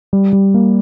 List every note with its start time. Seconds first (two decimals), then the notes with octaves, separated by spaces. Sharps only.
0.13 G3
0.33 G3
0.54 A#3